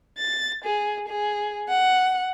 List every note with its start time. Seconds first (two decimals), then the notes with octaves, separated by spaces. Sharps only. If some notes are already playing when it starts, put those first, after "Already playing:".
0.18 A6
0.64 G#4
1.08 G#4
1.69 F#5